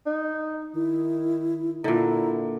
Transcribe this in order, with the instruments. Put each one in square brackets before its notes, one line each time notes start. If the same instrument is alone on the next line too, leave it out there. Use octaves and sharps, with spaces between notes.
[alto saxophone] D#4
[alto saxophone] D#3 [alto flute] E4
[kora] A#2 D3 [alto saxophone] E4 [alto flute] A#5